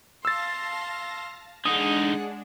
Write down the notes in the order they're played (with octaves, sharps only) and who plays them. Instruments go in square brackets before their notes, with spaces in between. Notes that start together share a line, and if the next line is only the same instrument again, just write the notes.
[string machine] F5 A5 A#6 [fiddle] C6 [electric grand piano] E6 A6
[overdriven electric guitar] D3 D#4 [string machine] G#3 D4 [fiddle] G#4 F#5 [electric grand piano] D#6